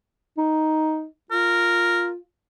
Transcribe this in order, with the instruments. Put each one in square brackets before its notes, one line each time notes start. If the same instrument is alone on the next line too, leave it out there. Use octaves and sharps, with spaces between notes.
[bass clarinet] D#4
[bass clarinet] F4 [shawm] A#4